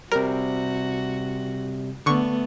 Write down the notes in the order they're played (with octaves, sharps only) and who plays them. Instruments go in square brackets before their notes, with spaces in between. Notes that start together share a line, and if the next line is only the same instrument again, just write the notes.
[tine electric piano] C3 G3 [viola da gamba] F#4 [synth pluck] A#4
[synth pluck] D3 C#6 [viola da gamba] A3 B3